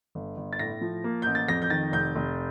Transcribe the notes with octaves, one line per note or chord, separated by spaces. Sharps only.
G1
G1
A6
A2 A#6
F3
A#3
A1 G6
A6
F2 A#6
G6
D#3 A6
F1 G6
F1